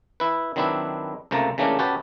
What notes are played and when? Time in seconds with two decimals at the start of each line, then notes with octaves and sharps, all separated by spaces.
0.20 E4 B4
0.56 D#3 F#3 C4 D4 E4 B4
1.31 C#2 C3 A3 A#3 A5 A#5
1.58 C#3 E3 A3 A#3 C#4 D4
1.79 C#4 F#4 G4 B4 A5